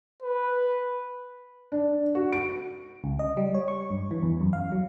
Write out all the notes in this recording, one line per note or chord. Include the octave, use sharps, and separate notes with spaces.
B4
D4
F#4
D7
C#2
D#5
G3
C#5
C#6
G2
E3
E2
F#2
F5
F#3